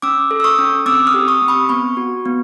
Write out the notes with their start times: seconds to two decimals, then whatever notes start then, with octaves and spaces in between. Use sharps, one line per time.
0.02 C#4 D6 E6
0.31 A4
0.40 E6
0.44 C#6 D#6
0.58 C#4
0.86 C4 D6 E6
1.07 D#6 F6
1.14 G4
1.28 C#6 D#6
1.42 C4
1.48 B5 C#6
1.69 B3 B5 C#6
1.97 F#4
2.25 B3